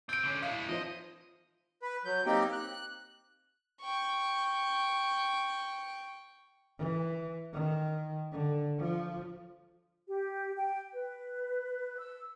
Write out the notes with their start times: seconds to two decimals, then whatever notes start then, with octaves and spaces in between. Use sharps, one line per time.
0.09 C4 G6 D7
0.25 D3 C#4
0.42 G#3 E4 F5
0.69 F3 C5 D#5
1.82 B4
2.05 F#3 G6
2.26 A#3 C4 D#4 G4 G5
2.53 F#6
3.81 G5 C#6
6.78 E3
7.53 D#3
8.32 D3
8.79 F3
10.08 G4
10.56 G5
10.94 B4
11.98 E6